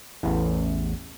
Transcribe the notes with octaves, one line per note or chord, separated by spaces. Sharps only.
A1 E2